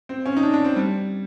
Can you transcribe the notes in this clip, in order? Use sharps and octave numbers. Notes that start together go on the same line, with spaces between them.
C4
C#4
D#4
D4
D4
C4
G3